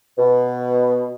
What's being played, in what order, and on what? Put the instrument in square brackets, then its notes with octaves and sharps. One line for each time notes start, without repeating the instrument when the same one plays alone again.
[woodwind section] B2